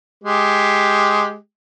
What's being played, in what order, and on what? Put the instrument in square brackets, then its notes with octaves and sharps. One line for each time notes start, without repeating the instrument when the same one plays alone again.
[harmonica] G#3 G4